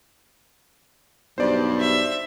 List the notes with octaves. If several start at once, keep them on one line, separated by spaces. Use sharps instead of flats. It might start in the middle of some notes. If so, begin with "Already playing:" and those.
B1 G2 C5 D5
E5